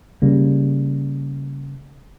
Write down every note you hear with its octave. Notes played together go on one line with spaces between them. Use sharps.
C#3 G3 A#3